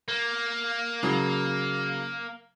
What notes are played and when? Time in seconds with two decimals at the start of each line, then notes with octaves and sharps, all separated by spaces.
0.08 A#3
1.03 C#3 F#3